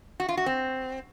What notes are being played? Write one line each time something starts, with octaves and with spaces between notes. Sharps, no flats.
F#4
F4
F#4
C4